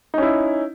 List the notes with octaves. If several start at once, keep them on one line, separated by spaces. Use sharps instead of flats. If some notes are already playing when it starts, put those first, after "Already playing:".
C#4 D#4 E4